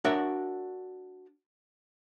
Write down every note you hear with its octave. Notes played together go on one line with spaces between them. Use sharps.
D4 F#4 A#4 C#5 E5